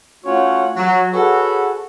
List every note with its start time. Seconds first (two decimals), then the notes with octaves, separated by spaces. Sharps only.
0.25 A3 C#4 F4 F#4 C#5 F#5
0.77 F#3
1.12 F#4 G#4 A4 B4 C#5 F#5